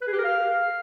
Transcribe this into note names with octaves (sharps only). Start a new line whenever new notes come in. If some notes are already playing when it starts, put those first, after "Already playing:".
B4
G#4
G4
A#4
F5